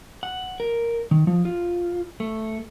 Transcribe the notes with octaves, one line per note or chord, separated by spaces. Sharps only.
F#5
A#4
D#3
F3
F4
A3